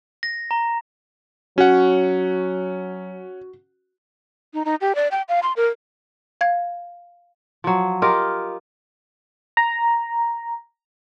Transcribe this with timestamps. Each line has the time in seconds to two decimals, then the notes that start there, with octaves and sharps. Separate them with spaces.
0.23 A#6
0.51 A#5
1.58 F#3 C#4 F#4 F#5
4.54 D#4
4.65 D#4
4.81 G4
4.95 D5
5.11 G5
5.29 F5
5.43 C6
5.56 A#4
6.41 F5 G#6
7.64 F3 F#3
8.02 F4 G4 A#4 D#5
9.57 A#5